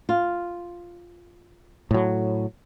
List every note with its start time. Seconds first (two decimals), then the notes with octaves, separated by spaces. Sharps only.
0.09 F4
1.91 A2 F#3